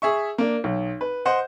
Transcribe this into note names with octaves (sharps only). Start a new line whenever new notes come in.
G#4 E5 C#6
A#3 D4
B1
B4
C5 D#5 F#5